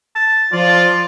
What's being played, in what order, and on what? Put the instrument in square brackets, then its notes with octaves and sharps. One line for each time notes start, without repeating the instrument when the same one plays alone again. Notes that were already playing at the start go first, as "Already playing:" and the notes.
[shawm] A5
[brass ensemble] F3 F4 [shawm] D5